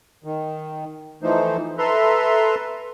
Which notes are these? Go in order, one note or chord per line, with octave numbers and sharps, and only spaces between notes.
D#3
E3 F3 A3 D#4 C5
A4 B4 E5 A#5 C6